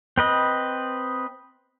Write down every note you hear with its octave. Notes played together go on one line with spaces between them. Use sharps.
C4 B4 D#5